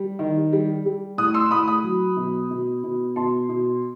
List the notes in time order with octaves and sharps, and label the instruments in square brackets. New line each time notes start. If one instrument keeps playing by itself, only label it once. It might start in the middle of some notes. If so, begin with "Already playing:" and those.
Already playing: [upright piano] G3
D#3
G3
G3
A2 D#6 F#6
C6 E6
A2 B5 D#6
B5 D#6
F#3
B2
B2
B2
B2 A5 C6
B2